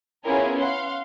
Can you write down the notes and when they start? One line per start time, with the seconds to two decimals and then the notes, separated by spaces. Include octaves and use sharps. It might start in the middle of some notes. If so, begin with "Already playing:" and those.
0.24 B3 C#4 E4 F4 G#4 A#4
0.57 F5 F#5 C6